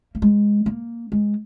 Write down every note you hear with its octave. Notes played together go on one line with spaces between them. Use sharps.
A#3
G#3
A#3
G#3